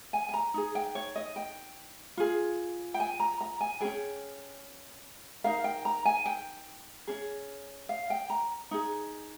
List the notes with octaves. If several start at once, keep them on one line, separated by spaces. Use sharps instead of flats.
G#5
G#5
A#5
D#4 G#4
G5
C#5
D#5
G5
F4 G#4
G5
G#5
A#5
A#5
G#5
C#4 F4 G#4 G5
D#4 A#4 F5
G5
A#5
G#5
G5
C#4 G#4
F5
G5
A#5
D#4 G#4